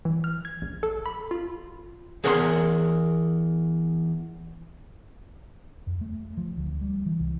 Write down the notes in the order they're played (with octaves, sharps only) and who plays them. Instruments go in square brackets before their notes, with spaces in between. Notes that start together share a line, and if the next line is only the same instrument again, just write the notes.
[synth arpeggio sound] E3
F6
G#6
A#1
A4
B5
F4
[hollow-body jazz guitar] E2 G#4 A#4 F#5 B5 C6
[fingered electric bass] F2
A3
F3
D2
G3
E3
C2